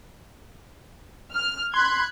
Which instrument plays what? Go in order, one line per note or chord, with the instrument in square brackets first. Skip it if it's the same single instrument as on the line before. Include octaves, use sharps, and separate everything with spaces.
[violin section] F6
[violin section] B5 F#6 G#6 [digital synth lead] C6